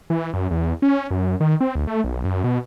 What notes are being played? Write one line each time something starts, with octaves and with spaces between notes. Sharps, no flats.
E3
F#2
E2
C#4
F#2
D#3
C4
D2
A3
B1
F#2
B2